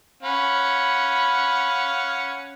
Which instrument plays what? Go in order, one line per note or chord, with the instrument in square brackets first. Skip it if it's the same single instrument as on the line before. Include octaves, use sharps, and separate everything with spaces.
[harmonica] C#4 F5 F#5 [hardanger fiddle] B5